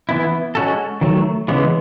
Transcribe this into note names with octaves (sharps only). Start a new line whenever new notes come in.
E3 B3 E4
G#3 C#4 F#4 A4
D#3 F#3 A3
C#3 E3 G#3 B3